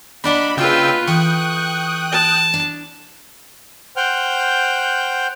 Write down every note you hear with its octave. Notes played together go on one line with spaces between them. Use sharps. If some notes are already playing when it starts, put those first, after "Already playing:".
A#3 D4 D#5 F#5 B5
C#3 F4 B4 G5 E6
E3 A4 G5 C#6 D#6 F#6
A5
D4
C5 F#5 G5 F6 G6